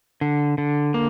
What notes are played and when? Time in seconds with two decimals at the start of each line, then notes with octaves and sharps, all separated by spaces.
0.21 D3
0.58 D3
0.94 A#3